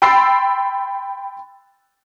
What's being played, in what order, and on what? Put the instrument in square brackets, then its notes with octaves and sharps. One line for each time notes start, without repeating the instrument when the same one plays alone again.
[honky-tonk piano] G5 B5 C6 E6 A6 C7